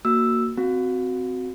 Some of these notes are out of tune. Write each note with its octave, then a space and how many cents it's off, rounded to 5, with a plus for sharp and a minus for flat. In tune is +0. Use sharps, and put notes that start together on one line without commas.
A#3 +0 F#4 +0 E6 +0
C4 -20 F#4 +0